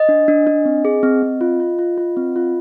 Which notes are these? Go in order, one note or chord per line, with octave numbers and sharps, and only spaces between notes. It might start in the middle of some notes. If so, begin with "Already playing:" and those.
Already playing: D#5
D4
D4
D4
C4
G#4
C4
C4
F4
F4
F4
F4
C4
F4